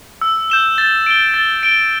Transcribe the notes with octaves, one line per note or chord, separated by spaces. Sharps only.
E6
G6 E7 G7
A6
D7 G7
A6
D7 G7